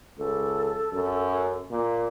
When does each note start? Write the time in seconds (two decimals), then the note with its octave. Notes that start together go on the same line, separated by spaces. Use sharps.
0.18 C#2 A4
0.93 F#2
1.71 A#2